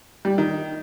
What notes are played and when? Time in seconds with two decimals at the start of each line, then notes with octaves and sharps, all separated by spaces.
0.25 G3
0.38 D#3